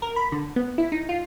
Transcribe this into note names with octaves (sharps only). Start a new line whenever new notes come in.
A#4
B5
D3
B3
E4
D#4
F4